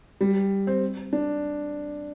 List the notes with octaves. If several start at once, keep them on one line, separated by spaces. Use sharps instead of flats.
G3
C4
D4